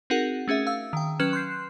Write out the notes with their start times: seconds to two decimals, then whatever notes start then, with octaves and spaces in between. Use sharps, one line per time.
0.10 C4 D#4 F#4 G#4 A#4 F#5
0.48 A3 C#4 G#4 E5
0.67 F5 E6
0.93 D#3 G5
1.19 F#3 C#4 B4 F6 F#6 E7
1.33 C6 F#6 G6 C7